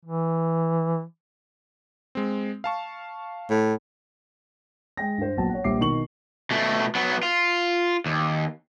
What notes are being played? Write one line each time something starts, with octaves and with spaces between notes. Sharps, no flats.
E3
G#3 C4
F5 A5 C#6
A2
G#3 G5 A#6
G2 C5
A#1 F#3 B3 A5
C#5 F#5
A#1 G3 E5 D6 C7
B2 D#3 C#6 F#7
B2 A3
F#3 B3
F4
D#2